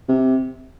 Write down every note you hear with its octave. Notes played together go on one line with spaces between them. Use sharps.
C3